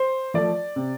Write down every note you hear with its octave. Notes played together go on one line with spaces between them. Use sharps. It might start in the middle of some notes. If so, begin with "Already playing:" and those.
Already playing: C5
F3 A3 D5
C3